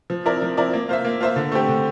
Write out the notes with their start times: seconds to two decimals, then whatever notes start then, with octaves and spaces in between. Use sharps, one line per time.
0.10 F3
0.26 C4 E4 A#4 D5
0.42 F3
0.57 C4 E4 A#4 D5
0.73 A#3
0.89 F4 C5 E5
1.05 A#3
1.21 F4 C5 E5
1.36 D3
1.52 A3 C4 G4
1.69 D3